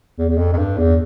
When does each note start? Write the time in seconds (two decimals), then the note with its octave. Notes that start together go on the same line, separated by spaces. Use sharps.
0.19 E2
0.29 E2
0.38 F2
0.53 F2
0.57 G2
0.78 E2